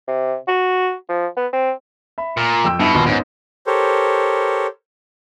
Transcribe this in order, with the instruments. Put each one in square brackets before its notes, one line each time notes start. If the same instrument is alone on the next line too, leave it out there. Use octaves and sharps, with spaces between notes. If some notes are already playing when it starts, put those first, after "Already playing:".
[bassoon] C3
F#4
F3
B3
C4
[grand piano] E5 B5
[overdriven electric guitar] A#2 [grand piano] F6
[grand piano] F2 G5 E6
[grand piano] G2 D#4 E4 [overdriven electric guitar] B2
[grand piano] A#1 D#2 A#2
[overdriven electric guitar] G#2 [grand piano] B3 C#4 D#4
[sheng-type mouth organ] G4 A4 A#4 C5 C#5